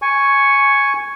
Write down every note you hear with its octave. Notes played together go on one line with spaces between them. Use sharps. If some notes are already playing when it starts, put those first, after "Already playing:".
G#5 C#6